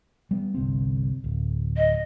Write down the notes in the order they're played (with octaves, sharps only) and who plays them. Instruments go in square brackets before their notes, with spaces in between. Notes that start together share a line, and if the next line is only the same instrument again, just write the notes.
[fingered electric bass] G3 B3
G1 C2 C4
D1
[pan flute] D#5